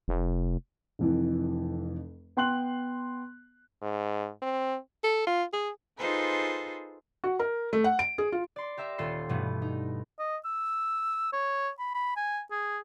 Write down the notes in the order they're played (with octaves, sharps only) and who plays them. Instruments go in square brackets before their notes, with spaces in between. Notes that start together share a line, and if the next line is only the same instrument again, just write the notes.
[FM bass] F1
[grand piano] F1 F2 E3
B3 G5 C6 F#6 F#7
[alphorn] G#2
C4
[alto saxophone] A4
F4
G#4
[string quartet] D#4 F4 G#4 A4 B4 C5
[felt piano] F#4
A#4
A3
F#5
D7
G#4
F4
[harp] D5 C6
G4 A#4 E5
D#1 F4 A4 C6 C7
G2 B2 E3 A3 B3
D#4
[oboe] D#5
E6
C#5
B5
B5
G#5
G#4